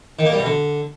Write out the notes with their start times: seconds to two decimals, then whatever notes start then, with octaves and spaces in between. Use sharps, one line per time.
0.19 D#3
0.26 A#3
0.32 G3
0.39 B2
0.46 D3